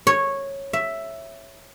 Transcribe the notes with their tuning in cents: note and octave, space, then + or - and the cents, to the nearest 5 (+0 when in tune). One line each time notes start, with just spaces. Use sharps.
C#5 -10
E5 +5